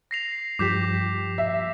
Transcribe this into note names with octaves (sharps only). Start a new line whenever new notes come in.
A#6 C7 F7
G2 F3 G4 D6 G6 B6
E5